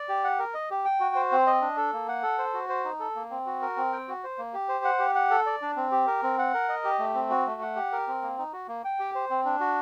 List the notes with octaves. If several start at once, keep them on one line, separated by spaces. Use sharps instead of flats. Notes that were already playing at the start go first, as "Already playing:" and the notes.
Already playing: D5
G4
F#5
A#4
D#5
G4
G5
F#4
C5
C4
D#5
D4
A4
A#3
F#5
A4
C5
F#4
C5
D#4
A4
A#3
C4
F#4
A#4
C4
G5
F#4
C5
A#3
G4
C5
F#5
G4
F#5
A4
D5
D4
C4
G4
A#4
C4
F#5
A#4
D#5
G4
A3
C4
F#4
A3
F#5
G4
A#4
C4
A#3
D#4
F#4
A#3
G5
G4
C5
C4
D4
F#4